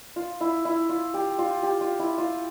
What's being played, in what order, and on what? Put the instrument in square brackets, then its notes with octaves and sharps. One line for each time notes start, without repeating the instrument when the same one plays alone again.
[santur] F4
E4
E4
F4
G4
F4
G4
F4
E4
F4